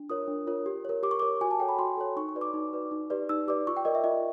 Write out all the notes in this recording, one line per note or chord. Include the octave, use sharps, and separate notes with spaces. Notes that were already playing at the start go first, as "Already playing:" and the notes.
Already playing: D4
F4 A#4 C#5 D#6
D4
F4 A#4 C#5
G4
A#4 C#5
G4 D6
C#6
D6
A#4 C#5
F#4 G#5
A5
A4 C#5 G5
B5
F#4 C6
A4 C#5
D#4 C#6
C#6
F#4 B4 D5
D6
D#4
F#4 B4 D5
D#4
G4 B4 D5
D#4 E6
G4 B4 D5 D6
F4 C#6
G5
A#4 D5 D#5
E5
F4 D#5